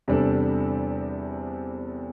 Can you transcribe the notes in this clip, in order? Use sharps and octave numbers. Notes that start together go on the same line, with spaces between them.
E2 C3 G3 D4 A4